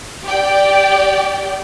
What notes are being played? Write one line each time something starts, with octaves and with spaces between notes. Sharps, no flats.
G4 D5 G5